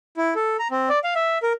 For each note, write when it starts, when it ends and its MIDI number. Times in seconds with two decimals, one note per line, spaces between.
0.17 0.34 64
0.35 0.57 69
0.59 0.68 82
0.71 0.89 60
0.89 0.99 74
1.04 1.14 77
1.15 1.38 76
1.43 1.53 70